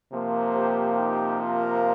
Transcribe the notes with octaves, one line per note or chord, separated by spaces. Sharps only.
C3 F3 A#3
G4 C5
D#4 G4
F4 A#4